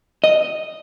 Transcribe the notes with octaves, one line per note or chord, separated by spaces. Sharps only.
D#5